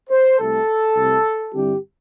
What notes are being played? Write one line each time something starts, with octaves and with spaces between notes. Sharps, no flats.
C5
C2 C3 A3 A4
C2 C3 A3
G2 D3 G3 C4 E4 G4